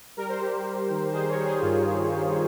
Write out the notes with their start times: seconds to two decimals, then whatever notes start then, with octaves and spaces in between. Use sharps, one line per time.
0.17 G3 A#4
0.29 C5
0.41 G3 G4 A#4
0.65 G3
0.89 D#3
1.12 D#3 G#4 C5
1.28 A#4 C#5
1.37 G3
1.45 G#4 C5
1.61 G2 F4